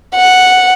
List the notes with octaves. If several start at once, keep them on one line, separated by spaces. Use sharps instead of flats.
F#5